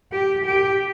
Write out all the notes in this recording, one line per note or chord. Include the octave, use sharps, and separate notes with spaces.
G4
G4